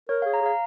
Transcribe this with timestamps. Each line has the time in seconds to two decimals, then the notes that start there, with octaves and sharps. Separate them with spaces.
0.09 A#4 C#5
0.22 G#4 F5
0.34 A#5
0.41 G#4 F5